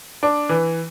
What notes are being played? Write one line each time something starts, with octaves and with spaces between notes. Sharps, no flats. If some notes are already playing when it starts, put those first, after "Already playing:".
D4
E3